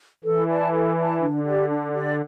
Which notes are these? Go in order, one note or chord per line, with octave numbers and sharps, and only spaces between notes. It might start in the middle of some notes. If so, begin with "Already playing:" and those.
E3 A4
D5 A5
A4
D5 A5
D3 D4
G4 D5
D4
G4 D5